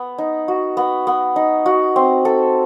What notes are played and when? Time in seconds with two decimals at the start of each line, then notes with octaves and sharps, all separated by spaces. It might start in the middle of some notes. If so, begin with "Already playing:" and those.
Already playing: B3
0.18 D#4
0.48 F#4
0.77 B3
1.07 B3
1.36 D#4
1.66 F#4
1.96 C4
2.25 A4